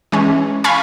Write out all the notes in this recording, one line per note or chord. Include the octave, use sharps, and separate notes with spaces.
E3 G#3 C#4
F5 G#5 B5 C#6